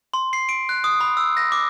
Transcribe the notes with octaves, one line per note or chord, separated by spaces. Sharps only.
C6
C7
D7
F#6
D#6
B5
E6
A#6
D6